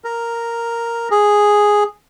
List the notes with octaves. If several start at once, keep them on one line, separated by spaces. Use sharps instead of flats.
A#4
G#4